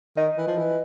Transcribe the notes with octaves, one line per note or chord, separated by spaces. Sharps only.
D#3 D#5
E3
F3
E3